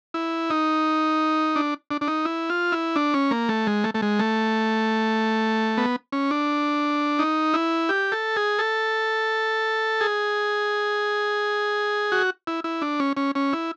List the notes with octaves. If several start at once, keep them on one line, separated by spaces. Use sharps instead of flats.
E4
D#4
D4
D4
D4
D#4
E4
F4
E4
D4
C#4
A#3
A3
G#3
A3
A3
G#3
A3
B3
C#4
D4
D#4
E4
G4
A4
G#4
A4
G#4
F#4
E4
E4
D4
C#4
C#4
C#4
E4